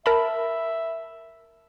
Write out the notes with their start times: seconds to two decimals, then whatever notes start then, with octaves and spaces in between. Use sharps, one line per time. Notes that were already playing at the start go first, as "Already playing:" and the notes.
0.06 A#4 E5 A5 B5